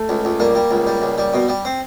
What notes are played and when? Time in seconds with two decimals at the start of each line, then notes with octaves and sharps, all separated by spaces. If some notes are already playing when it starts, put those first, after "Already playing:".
Already playing: A3
0.09 C#2
0.25 C#2
0.40 G3 A#3
0.55 G3
0.71 C#2
0.87 G3
1.02 C#2
1.18 G3
1.34 B2
1.48 G3
1.65 C4